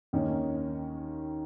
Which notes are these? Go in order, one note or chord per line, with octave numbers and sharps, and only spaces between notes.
D#2 D#3 A#3 C#4